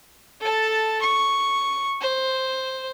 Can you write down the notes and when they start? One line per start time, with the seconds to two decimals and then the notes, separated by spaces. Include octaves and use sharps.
0.41 A4 A5
1.02 C#6
2.01 C5